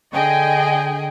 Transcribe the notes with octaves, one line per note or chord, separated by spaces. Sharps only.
D3 G#4 D#5 G5